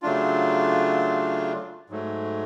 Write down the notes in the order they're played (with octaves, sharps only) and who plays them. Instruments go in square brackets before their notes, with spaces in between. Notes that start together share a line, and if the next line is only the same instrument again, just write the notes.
[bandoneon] C#3 F#3 A3 D4 F4
G#2 F#3 A3